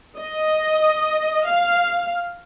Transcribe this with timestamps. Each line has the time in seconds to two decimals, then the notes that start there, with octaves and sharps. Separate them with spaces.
0.17 D#5
1.46 F5